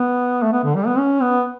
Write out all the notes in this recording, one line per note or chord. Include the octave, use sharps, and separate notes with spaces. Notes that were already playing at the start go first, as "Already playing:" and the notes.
Already playing: B3
A3
B3
D3
G3
B3
C#4
B3